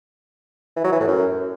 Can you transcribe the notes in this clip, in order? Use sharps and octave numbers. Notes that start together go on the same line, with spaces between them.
E3
F#3
E3
A2
F#2